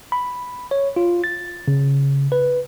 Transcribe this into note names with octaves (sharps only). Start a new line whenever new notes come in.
B5
C#5
F4
A6
C#3
B4